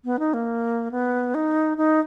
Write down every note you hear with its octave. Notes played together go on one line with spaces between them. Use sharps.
B3
D#4
A#3
B3
D#4
D#4